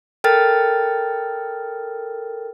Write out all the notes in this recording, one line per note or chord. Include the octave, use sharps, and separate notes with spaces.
A4 A#4 G5 F6 A6